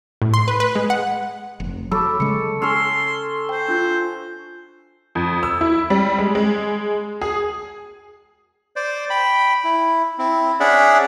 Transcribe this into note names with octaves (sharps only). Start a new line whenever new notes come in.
A2
C6
B4
B4
G#3
F#5
F1
F#3 A4 B5 C#6 D6
C#3 G#3 C#7
C#4 A4 C6 E6
C5 G5
D4 F4 G6
F2
E6
E4
G3
G#3
G#3
G#4
C5 D5
G5 B5
E4
C4 E4
C#4 D4 G#4 D5 E5 F#5